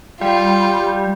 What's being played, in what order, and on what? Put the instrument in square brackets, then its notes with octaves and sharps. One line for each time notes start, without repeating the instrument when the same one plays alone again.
[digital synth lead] G3 [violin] F4